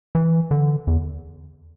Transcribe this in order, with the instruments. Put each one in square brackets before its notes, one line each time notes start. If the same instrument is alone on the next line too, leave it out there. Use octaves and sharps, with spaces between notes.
[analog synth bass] E3
D3
E2